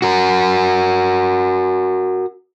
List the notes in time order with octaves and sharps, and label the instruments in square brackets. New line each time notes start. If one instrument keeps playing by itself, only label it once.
[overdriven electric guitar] F#4 A#4